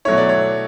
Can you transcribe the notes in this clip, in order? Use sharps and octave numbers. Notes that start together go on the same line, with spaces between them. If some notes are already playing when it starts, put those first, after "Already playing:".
B2 F#3 A3 E4 C#5
D5
C#5